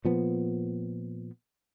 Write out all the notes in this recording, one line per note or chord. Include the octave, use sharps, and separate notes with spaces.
A#2 F3 B3